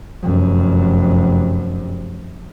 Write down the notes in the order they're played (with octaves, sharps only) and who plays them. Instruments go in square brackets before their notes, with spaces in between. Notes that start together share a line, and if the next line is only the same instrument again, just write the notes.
[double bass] F1 F#2